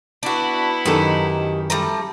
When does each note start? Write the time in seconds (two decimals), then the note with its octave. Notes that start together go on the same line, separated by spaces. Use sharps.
0.23 B3 D4 E4 F#4
0.85 F#2 D#3 D#4 G4 A4
1.70 G3 A3 A#5